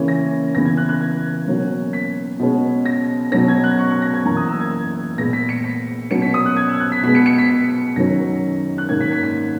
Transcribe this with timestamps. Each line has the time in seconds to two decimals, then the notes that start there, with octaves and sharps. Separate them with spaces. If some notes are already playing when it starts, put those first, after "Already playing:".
Already playing: C#3 E3 A#3 C#4
0.08 A#6
0.54 C#3 E3 B3 A#6
0.65 G#6
0.77 F#6
0.89 F#6
1.01 G#6
1.47 B2 F#3 A#3 C#4
1.93 B6
2.39 B2 G#3 C#4
2.85 A#6
3.32 B2 F#3 C#4 A#6
3.48 G#6
3.64 F#6
3.79 C#6
3.91 C#6
4.02 A#6
4.14 G#6
4.25 F#2 E3 A#3 A#5
4.37 D#6
4.48 E6
4.60 G#6
5.18 A#2 G#3 B3 A#6
5.33 B6
5.49 C#7
5.64 B6
6.10 B2 F#3 C#4 C#7
6.22 B6
6.34 D#6
6.46 F#6
6.57 G#6
6.69 E6
6.80 F#6
6.92 B6
7.03 B2 G#3 B3 B6
7.15 C#7
7.26 C#7
7.38 B6
7.49 B6
7.96 F#2 D#3 F#3 C#4 A#6
8.78 F#6
8.89 G#2 D#3 A#3 C#4 G#6
9.01 B6
9.12 B6
9.23 B6